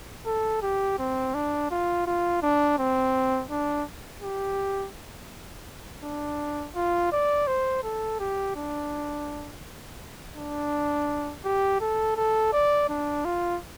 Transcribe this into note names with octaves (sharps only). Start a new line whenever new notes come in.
A4
G4
C4
D4
F4
F4
D4
C4
D4
G4
D4
F4
D5
C5
A4
G4
D4
D4
G4
A4
A4
D5
D4
F4